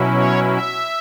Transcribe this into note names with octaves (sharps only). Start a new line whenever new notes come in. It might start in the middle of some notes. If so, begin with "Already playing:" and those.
Already playing: B2 F#3 C#4 E4
C#5
E5